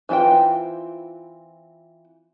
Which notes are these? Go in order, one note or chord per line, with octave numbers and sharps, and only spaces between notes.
E3 C4 F4 B4 G5